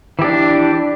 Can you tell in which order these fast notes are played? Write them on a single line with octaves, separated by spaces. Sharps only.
E3 G4 D4